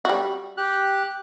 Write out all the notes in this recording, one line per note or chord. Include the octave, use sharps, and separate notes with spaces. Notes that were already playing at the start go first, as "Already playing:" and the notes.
G3 F#4
G4 F#6